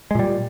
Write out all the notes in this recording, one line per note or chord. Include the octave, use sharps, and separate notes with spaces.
A#2 G3 G#3